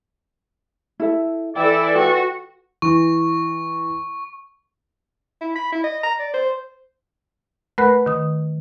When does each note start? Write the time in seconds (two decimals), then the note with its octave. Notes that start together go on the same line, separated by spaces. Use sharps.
1.00 E4 A4 E5
1.56 E3 E4 A4 D5 G5
1.95 F#4 B4 G5
2.82 E3 C#6
5.41 E4
5.56 B5
5.73 E4
5.84 D#5
6.03 A#5
6.19 D5
6.34 C5
7.78 A3 A#4 B4 F#5 B5 F#6
8.06 D#3 D#6